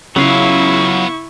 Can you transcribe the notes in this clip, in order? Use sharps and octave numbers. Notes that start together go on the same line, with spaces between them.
C#3 F#3 B3 E4 F4 F5 C#6